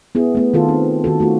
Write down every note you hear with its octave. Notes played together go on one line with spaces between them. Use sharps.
B3 E4 G#4
A3 B3
D#3 F4 A4
C4
D#3 F#4 A4
A3 F4 F#4